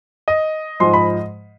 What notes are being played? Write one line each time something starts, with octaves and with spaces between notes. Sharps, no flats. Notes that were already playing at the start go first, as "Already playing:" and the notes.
D#5
G#2 F3 G#3 C6
B5